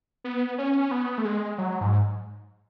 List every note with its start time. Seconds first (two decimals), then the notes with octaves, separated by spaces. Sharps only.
0.24 B3
0.58 C#4
0.91 B3
1.18 A3
1.25 G#3
1.58 F#3
1.81 G#2